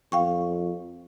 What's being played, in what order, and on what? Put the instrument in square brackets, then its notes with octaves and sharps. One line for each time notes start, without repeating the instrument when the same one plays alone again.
[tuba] F2 [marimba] F5 G5 C#6